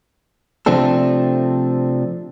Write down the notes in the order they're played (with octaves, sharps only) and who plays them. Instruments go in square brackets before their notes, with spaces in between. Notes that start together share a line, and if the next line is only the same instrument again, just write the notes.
[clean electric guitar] C3 F3 A3 C4 D4 A4